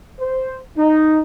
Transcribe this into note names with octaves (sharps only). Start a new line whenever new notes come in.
C5
D#4